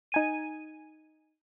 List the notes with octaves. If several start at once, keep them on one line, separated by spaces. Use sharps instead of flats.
D#4 G#5 D#7